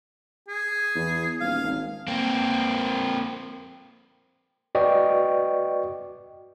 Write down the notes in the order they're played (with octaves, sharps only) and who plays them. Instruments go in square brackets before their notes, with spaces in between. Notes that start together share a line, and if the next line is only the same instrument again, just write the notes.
[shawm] G#4
[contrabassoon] E2
[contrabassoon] D#1 [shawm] F5
[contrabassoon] G#1
[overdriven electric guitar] A#3 C4
[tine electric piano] F#4 B4 D5 D#5 G5 C#6